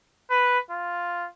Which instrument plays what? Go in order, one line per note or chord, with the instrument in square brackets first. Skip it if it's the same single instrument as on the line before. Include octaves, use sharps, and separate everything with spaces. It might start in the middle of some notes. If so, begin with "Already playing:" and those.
[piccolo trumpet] B4
F4